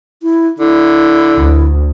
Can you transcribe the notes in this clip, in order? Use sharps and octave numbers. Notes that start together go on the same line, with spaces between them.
E4
D3 E4
D2